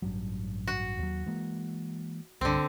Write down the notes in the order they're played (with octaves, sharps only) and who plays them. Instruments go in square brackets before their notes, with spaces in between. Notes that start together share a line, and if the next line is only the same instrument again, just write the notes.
[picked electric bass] A1 G2 F#3
[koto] F#4
[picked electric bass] D#2 F#3
E3 G#3 A#3
[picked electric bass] C2 G2 [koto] D3 C4